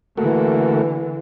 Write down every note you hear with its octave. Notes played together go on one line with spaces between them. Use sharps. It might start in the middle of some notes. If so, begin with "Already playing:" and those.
D3 E3 A3 A#3 F#4